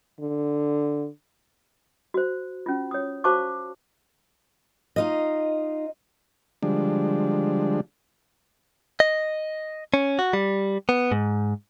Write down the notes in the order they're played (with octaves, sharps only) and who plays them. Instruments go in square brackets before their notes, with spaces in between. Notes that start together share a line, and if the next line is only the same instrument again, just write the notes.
[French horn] D3
[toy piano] F#4 C5
C#4 F4
C#5 D#6
F#4 C5 F5 A5 C#6 D6
[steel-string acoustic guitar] D#4 F4 D#5
[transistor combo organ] D3 F3 G3 G#3 D4
[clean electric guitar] D#5
C#4
F#4
G3
B3
G#2